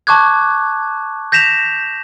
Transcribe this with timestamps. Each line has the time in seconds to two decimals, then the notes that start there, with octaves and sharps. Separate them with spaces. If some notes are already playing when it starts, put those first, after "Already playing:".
0.07 A5 C#6 D6 F#6 G#6
1.32 G6 A#6 B6 E7 F7